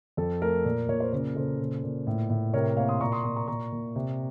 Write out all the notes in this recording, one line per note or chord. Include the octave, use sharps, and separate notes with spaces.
F2 A4
A3 A#4
A#2
A#2 C#5
C5
C#3 A#4
C#3 A4 C5
A#2
A#2
A2
A2
C3 A#4 C#5
A#3 C#5 F5
C6 D#6
A#2 A#5 C#6
C6 D#6
A#2 C6 D#6
A#5 C#6
A#2 A#5 C#6
A#2
C3